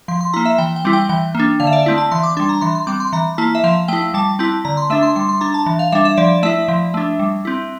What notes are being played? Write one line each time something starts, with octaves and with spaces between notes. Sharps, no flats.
F3 C6
C6
A#3 E4 A#5
E5
E3 G5
G5
G3 C4 E4
G5
E3 G5
A#3 D4
D3 F5
E5
D5
A3 C4 E4
A5
E3 C6
D6
G3 D4 C6
A#5
E3 C6
C6
G3 C4 D6
C6
E3 A#5
A#3 E4 A5
E5
F3 F5
A3 E4 G5
G3 A5
C4 E4 A5
D3 A#5
C6
A3 D4 E5
C6
G3 C6
C6
D4 A#5
A5
E3
F5
G3 D4 E5
E5
F3 D5
A3 E4 E5
F3
A3 D4
G3
C4 E4